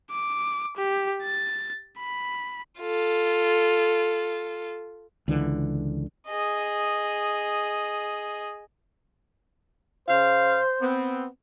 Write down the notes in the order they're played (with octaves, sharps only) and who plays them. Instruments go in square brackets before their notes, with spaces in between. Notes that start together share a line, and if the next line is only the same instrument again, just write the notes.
[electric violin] D6
G4
A6
B5
[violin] F4 A4
[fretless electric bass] C#2 D3 E3
[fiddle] G#4 D#5
[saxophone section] C#3 F5 [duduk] C5
[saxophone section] B3 C4